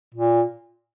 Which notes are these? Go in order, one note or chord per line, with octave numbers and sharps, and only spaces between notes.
A#2